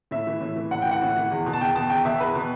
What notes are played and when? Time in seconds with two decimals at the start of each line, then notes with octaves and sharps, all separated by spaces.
0.11 A2 E5
0.27 E3
0.41 A2
0.56 E3
0.71 A2 F#5
0.82 E3 G5
0.91 F#5
1.01 A2
1.16 E3
1.31 E2
1.46 B2
1.53 A5
1.61 E2 G5
1.75 B2 A5
1.90 E2 G5
2.05 B2 E5
2.20 E2 B4
2.35 B2